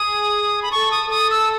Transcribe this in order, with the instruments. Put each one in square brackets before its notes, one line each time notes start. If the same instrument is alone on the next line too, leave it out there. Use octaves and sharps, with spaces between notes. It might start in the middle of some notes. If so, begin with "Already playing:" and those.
Already playing: [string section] G#4 [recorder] D#6
[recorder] B5
[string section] A4 [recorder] C#6
[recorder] D#6
[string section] A4 [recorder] D#6
[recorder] E6